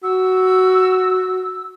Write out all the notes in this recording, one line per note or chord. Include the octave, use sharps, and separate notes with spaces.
F#4 E6